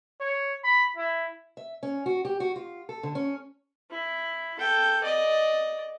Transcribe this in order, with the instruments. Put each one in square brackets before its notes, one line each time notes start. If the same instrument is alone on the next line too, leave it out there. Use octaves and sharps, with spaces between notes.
[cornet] C#5
B5
E4
[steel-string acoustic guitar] E5
C#4
F#4
G4
F#4
F4
A4
D3
C#4
[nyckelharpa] E4
A4 G5
D5 D#5